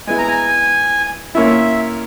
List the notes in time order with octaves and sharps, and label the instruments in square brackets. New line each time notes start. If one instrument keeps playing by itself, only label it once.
[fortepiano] G#3 B3 E4 [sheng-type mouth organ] G#5
[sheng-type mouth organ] A#5
G#5
[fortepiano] A#2 A#3 C#4 E4 [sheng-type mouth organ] E5